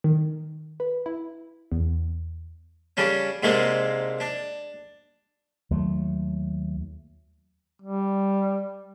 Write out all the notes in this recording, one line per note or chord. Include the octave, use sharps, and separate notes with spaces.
D#3
B4
E4
E2
C#3 G3 C#4 D4
G#2 C3 G#3 A#3 C4 D4
D4
D#2 F#3 A3
G3